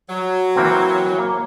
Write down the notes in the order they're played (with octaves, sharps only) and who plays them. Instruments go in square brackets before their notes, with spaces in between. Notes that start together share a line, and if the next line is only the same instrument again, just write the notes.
[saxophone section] F#3
[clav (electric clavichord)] E3 A#3 C4
A#3